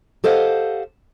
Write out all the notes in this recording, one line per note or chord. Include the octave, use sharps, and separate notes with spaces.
G4 A4 C5 D#5 F5 F#5